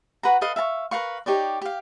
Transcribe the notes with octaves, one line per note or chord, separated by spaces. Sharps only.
F#4 B4 F#5 A#5
A4 B4 D#5 F5
E5 F5 A5 C#6
A#4 B4 F5 C#6
D#4 G4 C#5 D5
G4 F5